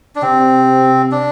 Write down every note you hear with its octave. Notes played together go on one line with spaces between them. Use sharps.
D4
C3 C4
D4